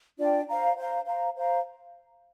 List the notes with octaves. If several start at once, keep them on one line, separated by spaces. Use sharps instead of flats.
D4 F4 D5 G5
C5 F5 A#5
C5 F5 A#5
C5 F5 A#5
C5 F5 A#5